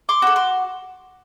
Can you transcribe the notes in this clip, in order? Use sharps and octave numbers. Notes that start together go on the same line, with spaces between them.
C6 D6
F#4 A4
C6 D6